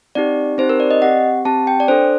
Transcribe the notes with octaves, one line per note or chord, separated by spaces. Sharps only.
C4 D#4 G4 D5
C4 D#4 G4 C5
A#4
D5
D#5
C4 G4 F#5
C4 G4 A5
G5
D5
D4 A4 C5